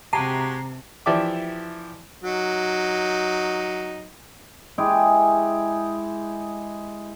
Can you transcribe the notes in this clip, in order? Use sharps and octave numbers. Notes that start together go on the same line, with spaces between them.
C3 G#3 F#4 G4 A5 A#5 C7
E3 F3 G4 D5 E5 D6
F#3 D#4
G#3 E4 G4 G#4